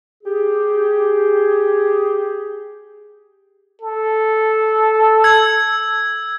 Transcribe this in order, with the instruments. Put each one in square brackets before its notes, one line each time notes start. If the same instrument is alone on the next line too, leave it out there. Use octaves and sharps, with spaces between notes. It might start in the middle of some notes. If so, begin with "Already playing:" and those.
[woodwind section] G4 G#4
[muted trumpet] A4
[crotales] E6 G#6